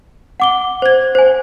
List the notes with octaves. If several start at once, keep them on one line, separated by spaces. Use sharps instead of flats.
F#5 D6 G7
C5 G#6
C5 G#5